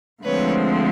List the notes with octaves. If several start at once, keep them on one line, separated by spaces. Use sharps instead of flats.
D2 D3 F3 G#3 C4 B4 C#5